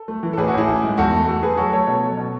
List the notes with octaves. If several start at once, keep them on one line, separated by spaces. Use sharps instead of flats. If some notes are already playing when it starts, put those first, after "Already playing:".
Already playing: A4
A3
E3
A4
A1 G#4 B4
F#4 A4
A1 E4 G#4
A1
G#2
E2 F#4 A4
A3
A3 F#4 A4
A3 G#4 B4
F#3 F#4 A4
A3 A4 C#5
B2
F#3
B2